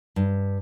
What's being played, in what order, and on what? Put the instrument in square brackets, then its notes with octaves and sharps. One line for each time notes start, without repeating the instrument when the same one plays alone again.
[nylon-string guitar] G2